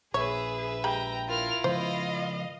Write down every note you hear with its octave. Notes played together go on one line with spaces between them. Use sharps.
A#1 G#4 B4 C#5 E5
G#3 G4 G5 A#5 B5
E4 F4 A#4 F6
C#3 F3 C5 D#5 F5